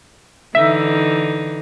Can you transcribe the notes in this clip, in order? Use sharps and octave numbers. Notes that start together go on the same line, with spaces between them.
D3 E3 D#4 E5